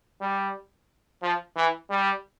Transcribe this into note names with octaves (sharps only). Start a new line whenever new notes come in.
G3
F3
E3
G3